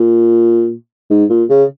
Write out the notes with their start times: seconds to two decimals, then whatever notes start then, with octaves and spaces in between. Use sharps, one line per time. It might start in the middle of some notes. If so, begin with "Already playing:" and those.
Already playing: A#2
1.10 G#2
1.30 A#2
1.50 C#3